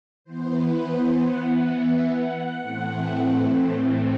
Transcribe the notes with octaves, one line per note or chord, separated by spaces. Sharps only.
E3 B3 C5
B4
C5
F#5
F#5
E5
F#5
A2 E3 A3 C4